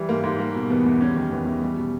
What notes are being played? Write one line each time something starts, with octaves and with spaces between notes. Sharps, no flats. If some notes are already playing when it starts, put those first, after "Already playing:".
Already playing: E3 G3
G#2 A#3
G#2
G3 A#3
B2
E2 B3
E2
G3 C#4
D#3
E2 B3
E2
G3
B2